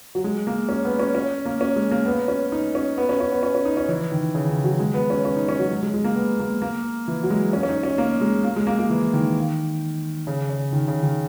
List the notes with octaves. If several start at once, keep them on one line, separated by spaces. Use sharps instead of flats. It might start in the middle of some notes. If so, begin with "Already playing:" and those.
F#3
G#3
A#3
C#4
B3
C#4
C#4
A#3
C#4
G#3
A#3
B3
C#4
D#4
C#4
B3
C#4
C#4
B3
C#4
C#4
D#4
C#4
E3
D#3
C#3
D#3
F#3
G#3
B3
C#4
C#4
D#4
C#4
F#3
G#3
G#3
G#3
A#3
B3
A#3
A#3
E3
F#3
G#3
C#4
C#4
D#4
C#4
A#3
G#3
A#3
G#3
A#3
A#3
E3
D#3
C#3
C#3
D#3
C#3
D#3